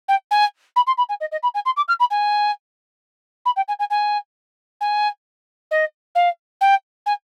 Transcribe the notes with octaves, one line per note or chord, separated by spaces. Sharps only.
G5
G#5
B5
C6
B5
G#5
D#5
D#5
B5
G#5
C6
D6
F6
B5
G#5
B5
G5
G#5
G#5
G#5
G#5
D#5
F5
G5
G#5